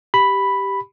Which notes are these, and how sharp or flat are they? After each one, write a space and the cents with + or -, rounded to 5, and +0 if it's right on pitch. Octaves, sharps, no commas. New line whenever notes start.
G4 +0 B5 +0